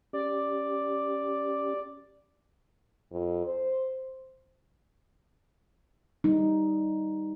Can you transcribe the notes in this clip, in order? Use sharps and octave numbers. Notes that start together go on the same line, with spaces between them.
C#4 G4 D5
F2
C5
G3 D#4